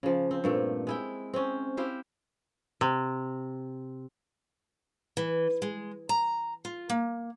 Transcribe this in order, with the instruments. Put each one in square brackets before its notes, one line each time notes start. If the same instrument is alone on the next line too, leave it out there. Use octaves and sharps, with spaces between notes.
[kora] C#3 F3
C4
G2 A#2 A3
G#3 E4 G5
C4 C#4
E4 G4 C5 F5
[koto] C3
[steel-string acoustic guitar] E3
G#3
A#5
F4
A#3